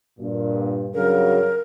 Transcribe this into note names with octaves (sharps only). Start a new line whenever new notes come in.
G2 A#2
G2 C#3 F#3 A#4